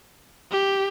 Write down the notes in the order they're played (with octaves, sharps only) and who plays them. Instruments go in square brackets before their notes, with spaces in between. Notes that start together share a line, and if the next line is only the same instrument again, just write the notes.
[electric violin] G4